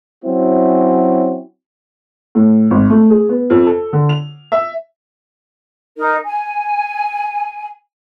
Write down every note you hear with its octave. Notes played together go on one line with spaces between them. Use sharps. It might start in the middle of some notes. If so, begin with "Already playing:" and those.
F#3 C4 C#4 E4 F#4
A2
G#1
A3
G#4
B3
F2
A4
D3
F7
E5
D#4 A#4
G#5